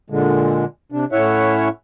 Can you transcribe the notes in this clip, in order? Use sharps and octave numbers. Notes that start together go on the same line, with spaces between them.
A#2 D3 G#3
C3 D4
A2 C#4 E4 C#5 E5 F#5